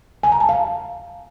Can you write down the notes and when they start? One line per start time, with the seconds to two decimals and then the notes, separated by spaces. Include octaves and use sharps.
0.23 G#5
0.32 A#5
0.40 A5
0.49 F5